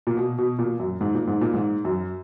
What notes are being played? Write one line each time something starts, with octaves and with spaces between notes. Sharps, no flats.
A#2
B2
B2
A#2
F#2
G#2
A#2
G#2
A#2
G#2
F#2